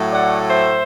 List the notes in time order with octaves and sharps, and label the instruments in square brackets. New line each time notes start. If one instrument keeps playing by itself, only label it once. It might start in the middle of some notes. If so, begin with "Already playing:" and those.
Already playing: [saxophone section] A2 F#3 A3
D5 F#5
C5 E5